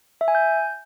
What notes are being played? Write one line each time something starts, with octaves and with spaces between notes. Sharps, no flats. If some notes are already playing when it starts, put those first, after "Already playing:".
E5
G#5
G6